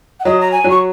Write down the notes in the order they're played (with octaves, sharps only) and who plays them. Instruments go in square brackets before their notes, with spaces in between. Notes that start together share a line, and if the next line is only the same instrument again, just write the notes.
[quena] F#5
[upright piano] F#3 [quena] D#5
[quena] A#5
G#5
[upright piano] F#3
[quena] C#6